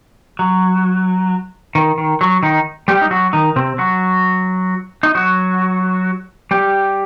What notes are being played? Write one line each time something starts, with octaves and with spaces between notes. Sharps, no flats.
F#3
D#3
D#3
F#3
D#3 D#4
G3 G4
D#4
F#3 F#4
D#3 D#4
C3 C4
F#3 F#4
D#4
F#3 F#4
G3 G4